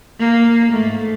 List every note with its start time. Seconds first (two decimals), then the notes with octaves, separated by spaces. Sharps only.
0.19 A#3
0.72 G#2 A3